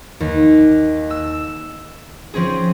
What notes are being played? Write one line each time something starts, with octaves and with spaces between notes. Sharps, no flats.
D#2
E6
F3 C4 C#4 G#4